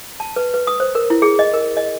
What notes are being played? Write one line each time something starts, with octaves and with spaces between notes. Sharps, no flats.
A5
B4
B4
D#6
C5
A#4
E4
G#4
D#5
A#4
D#5